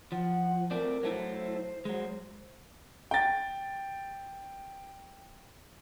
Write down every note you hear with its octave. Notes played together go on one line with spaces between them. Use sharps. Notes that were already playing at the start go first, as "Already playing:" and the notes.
F3 F#5
A3 C4 A#4 D5
F#3 A3 E4 C5
F#3 G#3 C5
G5 A6